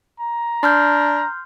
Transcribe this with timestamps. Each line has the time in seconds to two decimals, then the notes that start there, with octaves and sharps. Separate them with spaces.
0.20 A#5
0.63 D4 C6 F6 G6